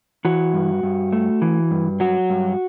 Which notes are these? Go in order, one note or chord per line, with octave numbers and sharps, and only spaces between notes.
E3 F#4
G2
G2
A3
E3
G2
F#3 F#4
G2